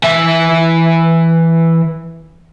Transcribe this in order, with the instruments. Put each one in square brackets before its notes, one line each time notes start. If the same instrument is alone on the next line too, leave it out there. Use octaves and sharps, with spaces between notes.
[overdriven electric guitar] E3 E5